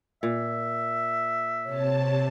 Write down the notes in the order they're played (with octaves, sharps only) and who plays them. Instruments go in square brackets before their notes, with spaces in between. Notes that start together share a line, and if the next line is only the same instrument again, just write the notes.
[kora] A#2 [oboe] E5
[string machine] C3 A5 [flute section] C#5